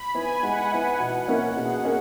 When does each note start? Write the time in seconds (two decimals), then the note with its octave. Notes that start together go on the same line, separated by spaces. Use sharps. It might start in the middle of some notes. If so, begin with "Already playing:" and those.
Already playing: B5
0.15 B3 E4 G#5
0.43 G#3 F#5
0.72 B3 E4
1.00 B2
1.28 A#3 C#4 E4
1.56 B2 G#4
1.85 A#3 C#4